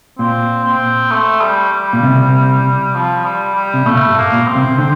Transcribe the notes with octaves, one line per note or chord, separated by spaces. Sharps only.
A#2 C4
C4
A3
G3
G3
A#2
C2 C3
F3
G3
G3
C3
A#2 A3
G2
A#3
A#2
C4
C2 C3
D3 C4